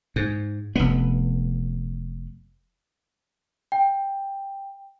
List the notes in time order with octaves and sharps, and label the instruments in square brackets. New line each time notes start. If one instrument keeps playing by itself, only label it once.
[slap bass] G#2
F1 B3
[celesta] G5